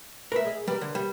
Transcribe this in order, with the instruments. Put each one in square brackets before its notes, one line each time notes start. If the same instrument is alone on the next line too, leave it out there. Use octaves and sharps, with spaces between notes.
[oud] A3 B4 [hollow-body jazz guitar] A#4 E5
[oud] G#4 D#5
[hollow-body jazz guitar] G3 [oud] A#4 B4
[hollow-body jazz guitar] D3
G3